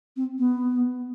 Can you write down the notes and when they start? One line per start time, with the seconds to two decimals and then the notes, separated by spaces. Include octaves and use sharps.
0.17 C4
0.39 B3